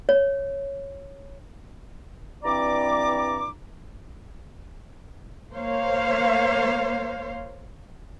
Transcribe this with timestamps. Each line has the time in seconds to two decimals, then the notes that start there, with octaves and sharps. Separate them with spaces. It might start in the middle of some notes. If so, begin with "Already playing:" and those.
0.09 C#5
2.44 G2 E3 C4 D5 A#5 D6
5.53 A#3 C5 C#5 F5